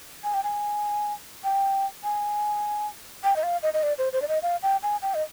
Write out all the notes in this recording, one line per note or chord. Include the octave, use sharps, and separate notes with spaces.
G#5
G5
G#5
G5
G#5
G5
D#5
F5
D#5
D#5
D5
C5
C5
D5
D#5
F5
G5
G#5
G5
D#5